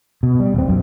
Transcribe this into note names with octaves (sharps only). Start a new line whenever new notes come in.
B2
G3
D#1 C4
B1 F#2